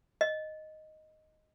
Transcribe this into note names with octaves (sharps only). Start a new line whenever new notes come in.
D#5